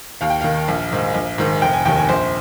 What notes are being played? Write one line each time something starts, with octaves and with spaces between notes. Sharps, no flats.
D#2 F5
G5
D#3 F5
A#1
G#2 D#3
A#1
G#2 D#3
F1 G5
G#5
D#2 D#3 G5
G#5
A#1 C5